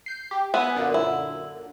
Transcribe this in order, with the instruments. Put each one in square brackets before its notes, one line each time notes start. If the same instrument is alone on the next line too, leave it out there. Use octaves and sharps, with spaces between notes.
[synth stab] G6 C7
G4
[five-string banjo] B3 [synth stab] E5 G#5 B5
[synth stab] F#2 A#2 D3
[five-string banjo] E4